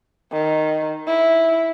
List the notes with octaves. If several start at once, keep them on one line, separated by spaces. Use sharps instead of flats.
D#3
E4